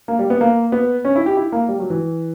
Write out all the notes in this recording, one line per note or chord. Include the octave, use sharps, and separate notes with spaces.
A#3
G3
B3
A#3
B3
C#4
E4
G4
E4
A#3
G3
F#3
E3